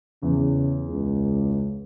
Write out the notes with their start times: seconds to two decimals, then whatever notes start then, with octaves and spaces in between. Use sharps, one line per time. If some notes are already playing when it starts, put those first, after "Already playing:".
0.23 E2 C#3
0.88 C#2